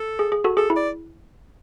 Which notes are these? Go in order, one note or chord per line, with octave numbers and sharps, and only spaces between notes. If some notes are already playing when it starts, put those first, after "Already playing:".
Already playing: A4
G#4
G#4
F#4 A4
G#4 A4
E4
D5